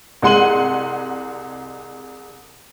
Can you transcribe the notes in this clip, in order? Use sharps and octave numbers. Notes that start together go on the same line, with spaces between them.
C2 G#3 F#5 C6 D#7 F#7